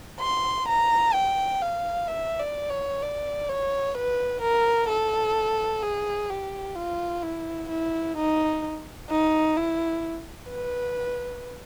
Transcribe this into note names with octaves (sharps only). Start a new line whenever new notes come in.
C6
A#5
G5
F5
E5
D5
C#5
D5
C#5
B4
A#4
A4
G#4
G4
F4
E4
E4
D#4
D#4
E4
B4